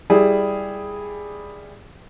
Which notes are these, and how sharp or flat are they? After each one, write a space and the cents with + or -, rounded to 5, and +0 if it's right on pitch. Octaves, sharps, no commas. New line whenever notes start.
G3 +10 E4 +0 G#4 +0